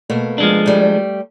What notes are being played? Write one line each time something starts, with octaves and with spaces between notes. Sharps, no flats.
B2 A3 A#3
F3 G#3 D4
G3 A3